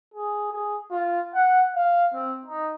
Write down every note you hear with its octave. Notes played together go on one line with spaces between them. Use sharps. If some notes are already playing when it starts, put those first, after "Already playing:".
G#4
G#4
F4
F#5
F5
C4
D#4